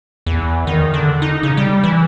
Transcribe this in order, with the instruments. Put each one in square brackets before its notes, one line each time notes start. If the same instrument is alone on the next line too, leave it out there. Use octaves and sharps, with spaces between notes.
[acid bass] E2
D#3
D3
D#4
C#3
G3
E3